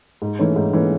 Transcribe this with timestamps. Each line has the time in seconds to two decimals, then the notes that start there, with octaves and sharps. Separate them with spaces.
0.22 G#2
0.39 E3 A3 C#4
0.56 G#2
0.73 E3 A3 C#4